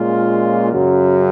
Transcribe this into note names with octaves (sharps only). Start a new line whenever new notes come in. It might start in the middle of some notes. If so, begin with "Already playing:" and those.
Already playing: A#2 G#3 C#4 F4
F#2 C#3 F#3